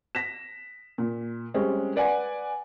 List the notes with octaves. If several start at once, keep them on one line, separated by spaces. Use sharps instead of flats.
A#6 B6 E7
A#2
G3 G#3 C4 C#4 G#4
B4 D5 F#5 G#5